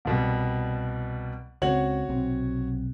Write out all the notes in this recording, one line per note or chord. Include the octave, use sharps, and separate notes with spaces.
C2 B2 G3
C#2 C#3 C4 F#4 C#5 F#7
B1 C3 C4